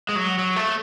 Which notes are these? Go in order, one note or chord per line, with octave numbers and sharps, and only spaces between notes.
G#3
F#3
F#3
A3